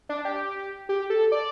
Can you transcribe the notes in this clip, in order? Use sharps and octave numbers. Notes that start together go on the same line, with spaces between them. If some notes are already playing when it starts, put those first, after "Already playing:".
D4
G4
G4
A4
D5